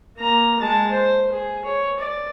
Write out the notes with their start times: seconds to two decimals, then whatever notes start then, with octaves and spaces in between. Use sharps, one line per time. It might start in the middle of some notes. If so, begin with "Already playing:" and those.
0.18 A#3 A#5
0.60 G#3 A5
0.92 C5
1.32 G#4
1.65 C#5
1.99 D5